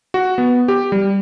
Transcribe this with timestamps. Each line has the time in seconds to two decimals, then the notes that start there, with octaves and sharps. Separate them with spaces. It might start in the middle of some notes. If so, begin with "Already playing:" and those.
0.14 F#4
0.38 B3
0.68 G4
0.92 G3